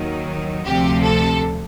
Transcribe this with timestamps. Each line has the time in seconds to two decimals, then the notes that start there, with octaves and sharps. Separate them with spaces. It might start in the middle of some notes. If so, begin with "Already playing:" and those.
Already playing: D#2 D#3 F#3
0.65 D2 C3 F3 G4
1.02 A4